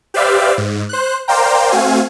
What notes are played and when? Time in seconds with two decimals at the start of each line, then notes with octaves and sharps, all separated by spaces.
0.14 G4 B4 C5 D5 E5 F5
0.58 G#2
0.89 C5 F#6
1.28 A#4 C5 D5 F5 G5 A#5
1.71 A3 C4 F#4 F5 G#5